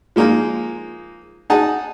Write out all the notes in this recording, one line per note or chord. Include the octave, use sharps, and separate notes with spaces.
F3 G#3 A#3 D#4 F4
D#4 G#4 F#5 A5